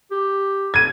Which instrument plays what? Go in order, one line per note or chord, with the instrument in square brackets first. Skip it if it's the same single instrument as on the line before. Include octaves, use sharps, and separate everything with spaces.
[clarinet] G4
[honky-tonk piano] G#6 D#7